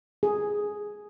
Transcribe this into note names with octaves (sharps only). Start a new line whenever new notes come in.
G#4